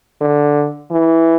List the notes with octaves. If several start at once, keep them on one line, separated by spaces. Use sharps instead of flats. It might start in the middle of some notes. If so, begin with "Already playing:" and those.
D3
E3